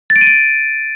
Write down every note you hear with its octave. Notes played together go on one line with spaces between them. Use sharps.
A6
D7
D#7
D7